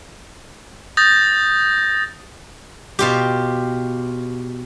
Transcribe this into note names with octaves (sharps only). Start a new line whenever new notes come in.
D#6 G6 A6 A#6
B2 F4 G4